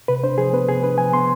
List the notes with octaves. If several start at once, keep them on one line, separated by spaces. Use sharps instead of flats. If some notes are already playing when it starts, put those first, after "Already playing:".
C3 B4
D4 C5
F3 G#4
B3 B4
C3 G#4
D4 B4
F3 G#5
B3 C6